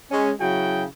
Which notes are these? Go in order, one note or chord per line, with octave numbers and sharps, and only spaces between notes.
G#3 C#4
C#3 F#3 E4 F#4 G#4 G5